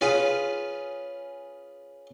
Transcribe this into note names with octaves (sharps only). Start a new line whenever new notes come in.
C#4 F4 G#4 B4